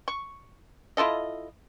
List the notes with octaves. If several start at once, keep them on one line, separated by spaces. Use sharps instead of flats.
C#6
E4 F4 A4 D#5